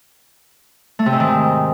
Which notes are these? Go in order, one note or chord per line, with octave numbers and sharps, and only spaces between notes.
A3
C3
G#2
D#3